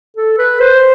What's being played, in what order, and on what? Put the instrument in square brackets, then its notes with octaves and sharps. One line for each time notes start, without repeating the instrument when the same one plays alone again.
[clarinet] A4
B4
C5